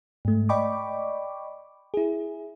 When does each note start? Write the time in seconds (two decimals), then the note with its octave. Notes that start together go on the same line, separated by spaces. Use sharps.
0.25 G#2 A3
0.49 D5 D#5 G5 B5 C#6 D6
1.94 E4 G#4